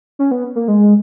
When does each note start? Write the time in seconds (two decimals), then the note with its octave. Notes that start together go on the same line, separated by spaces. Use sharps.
0.19 C#4
0.31 B3
0.55 A#3
0.68 G#3